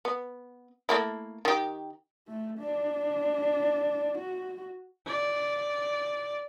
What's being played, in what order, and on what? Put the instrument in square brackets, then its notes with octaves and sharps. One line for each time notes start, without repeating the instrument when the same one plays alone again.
[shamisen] B3
A3 A#3 E4
D#3 G4
[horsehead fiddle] A3
D4
F#4
D5